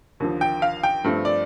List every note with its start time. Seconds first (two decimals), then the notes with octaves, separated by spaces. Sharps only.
0.20 D#2 D3 F3
0.41 G5
0.62 F5
0.83 G5
1.04 G2 F3 A3 C4
1.25 D5